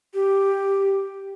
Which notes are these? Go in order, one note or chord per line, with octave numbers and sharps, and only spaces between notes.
G4